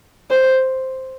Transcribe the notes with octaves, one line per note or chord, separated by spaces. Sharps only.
C5